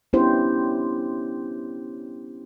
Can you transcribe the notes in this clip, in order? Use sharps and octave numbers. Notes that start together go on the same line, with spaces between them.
B3 C#4 D4 E4 G4 C5